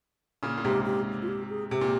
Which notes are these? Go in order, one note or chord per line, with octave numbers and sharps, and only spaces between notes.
A#2 C#3
A#2
G#2 C3 G4
G4
F4
G4
G#4
C3 G4
A#2